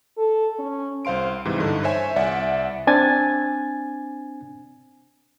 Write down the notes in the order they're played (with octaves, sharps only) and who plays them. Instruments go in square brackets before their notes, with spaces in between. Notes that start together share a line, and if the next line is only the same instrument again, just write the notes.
[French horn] A4
C#4
[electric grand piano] C2 C5 F5 C6 D7
G#2 C3 E3
G2 D3 D#4
C5 C#5 E5 G#5
C2 D5 E5 F#5
[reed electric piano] C4 D4 G#5 G#6 A6